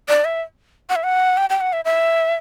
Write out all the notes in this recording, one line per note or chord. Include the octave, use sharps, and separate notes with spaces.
D5
E5
F#5
E5
F#5
G5
G5
F#5
E5
E5